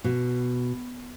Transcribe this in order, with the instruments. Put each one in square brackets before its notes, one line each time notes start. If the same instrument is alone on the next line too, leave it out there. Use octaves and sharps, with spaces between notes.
[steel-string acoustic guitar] B2